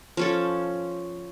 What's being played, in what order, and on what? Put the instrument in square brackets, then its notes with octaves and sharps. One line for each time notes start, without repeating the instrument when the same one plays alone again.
[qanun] F3 C#4 A4